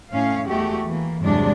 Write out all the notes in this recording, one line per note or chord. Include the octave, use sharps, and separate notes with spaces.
A2 C#4 F5
E2 G#3 A3 F#4 G4
E3 A#3
E2 G2 C3 F#3 G#3 D4